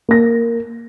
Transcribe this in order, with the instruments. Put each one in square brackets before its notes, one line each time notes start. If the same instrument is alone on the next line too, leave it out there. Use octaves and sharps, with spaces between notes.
[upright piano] A#3 A#6